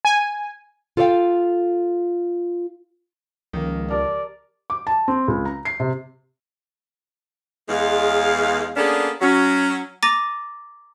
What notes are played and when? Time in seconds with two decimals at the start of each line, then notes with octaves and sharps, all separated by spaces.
0.05 G#5
0.97 F4 A4 C5 D5 F5 G5
3.53 C#2 D#3 F3 A#3
3.91 G4 A#4 D5 A5
4.70 D6
4.87 A5
5.08 C4
5.28 C#2
5.45 A#5
5.65 C7
5.80 C3
7.69 E2 G#3 F5
8.76 A#3 B3 C#4 D4 G#4 A4
9.21 F#3 C#4
10.03 A#5 D6 A6 A#6 D#7